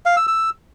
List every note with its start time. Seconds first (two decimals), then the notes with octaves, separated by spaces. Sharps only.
0.06 F5
0.17 E6
0.27 E6